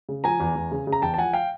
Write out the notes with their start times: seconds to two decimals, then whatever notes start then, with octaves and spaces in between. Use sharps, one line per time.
0.09 C#3
0.24 F3 G#5 A#5
0.40 E2
0.56 E2
0.71 C#3
0.87 C#3
0.92 A#5
1.02 E2 G5 A5
1.14 A5
1.18 F3 F#5 G#5
1.34 F5 G5